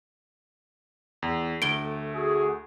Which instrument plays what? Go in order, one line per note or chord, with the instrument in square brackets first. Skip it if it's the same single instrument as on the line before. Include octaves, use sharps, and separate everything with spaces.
[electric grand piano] E2
[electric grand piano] D2 [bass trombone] A3 [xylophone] D7 G7
[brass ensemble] F#4 G#4